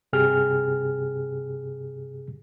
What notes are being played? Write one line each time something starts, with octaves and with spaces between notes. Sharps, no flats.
G2 C3 G4 G#4 F6